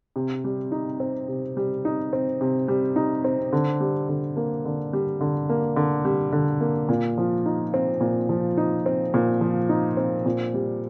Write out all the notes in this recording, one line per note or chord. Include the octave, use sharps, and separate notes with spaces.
C3
G3
D#4
C4
C3
G3
D#4
C4
C3
G3
D#4
C4
D3
G3
D3
A#3
D3
G3
D3
A#3
D3
G3
D3
A#3
A#2
F3
D#4
C4
A#2
F3
D#4
C4
A#2
F3
D#4
C4
A#2
G3